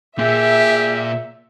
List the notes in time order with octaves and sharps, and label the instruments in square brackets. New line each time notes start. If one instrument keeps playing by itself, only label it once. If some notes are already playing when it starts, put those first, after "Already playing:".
[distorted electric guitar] A#2 [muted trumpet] G4 [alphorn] G#4 [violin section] E5